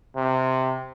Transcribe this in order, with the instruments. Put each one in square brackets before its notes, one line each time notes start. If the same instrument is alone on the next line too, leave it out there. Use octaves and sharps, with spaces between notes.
[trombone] C3